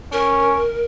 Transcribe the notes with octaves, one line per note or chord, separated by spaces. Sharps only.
C#4 A#4